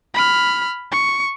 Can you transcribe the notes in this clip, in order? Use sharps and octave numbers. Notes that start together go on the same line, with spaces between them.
B5 F6
C#6